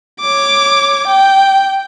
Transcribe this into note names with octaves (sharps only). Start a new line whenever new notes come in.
C#5 D6
G5